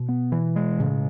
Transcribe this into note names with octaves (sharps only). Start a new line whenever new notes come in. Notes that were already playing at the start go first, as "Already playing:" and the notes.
Already playing: B2
B3
E3
G#3
A2 C#3